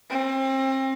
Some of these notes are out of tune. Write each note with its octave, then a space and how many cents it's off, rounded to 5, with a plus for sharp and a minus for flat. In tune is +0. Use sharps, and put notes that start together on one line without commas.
C4 +35